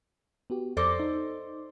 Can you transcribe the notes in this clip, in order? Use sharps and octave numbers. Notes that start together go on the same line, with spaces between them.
B3 F#4 G4
F2 A4 C5 D5 D6 A#6
D#4